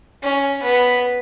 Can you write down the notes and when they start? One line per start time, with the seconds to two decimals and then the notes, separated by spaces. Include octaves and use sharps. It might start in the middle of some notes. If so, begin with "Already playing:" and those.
0.23 C#4
0.63 B3